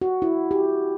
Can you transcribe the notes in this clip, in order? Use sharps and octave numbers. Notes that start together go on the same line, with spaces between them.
F#4
E4
G4